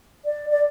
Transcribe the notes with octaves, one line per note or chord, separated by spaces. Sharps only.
D5
D5